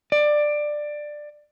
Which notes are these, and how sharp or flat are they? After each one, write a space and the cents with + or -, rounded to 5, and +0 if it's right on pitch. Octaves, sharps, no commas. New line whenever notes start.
D5 +15